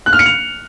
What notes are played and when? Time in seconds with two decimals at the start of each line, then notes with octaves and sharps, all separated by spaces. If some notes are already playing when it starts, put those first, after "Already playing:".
0.06 F#6
0.13 F6
0.19 C#7
0.26 F7